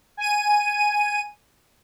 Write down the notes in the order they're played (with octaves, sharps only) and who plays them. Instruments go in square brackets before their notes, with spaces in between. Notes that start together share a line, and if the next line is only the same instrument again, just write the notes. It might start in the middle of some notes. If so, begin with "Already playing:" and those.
[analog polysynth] G#5 D#7